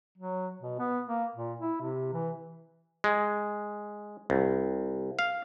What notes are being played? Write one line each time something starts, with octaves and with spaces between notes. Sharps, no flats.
F#3
B2
B3
A#3
A#2
E4
C3
E3
G#3
C2
F5